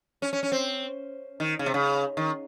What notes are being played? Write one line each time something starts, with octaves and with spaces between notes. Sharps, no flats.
C#4
C#4
C#4
C4
D#3
C#3
C3
C#3
D#3